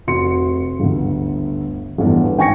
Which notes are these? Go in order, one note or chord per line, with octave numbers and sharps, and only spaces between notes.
F1 F#4 C6 C#7
G1 D2
G1 E2 A2
G#1 G5 G#5 C#6 A#6 C#7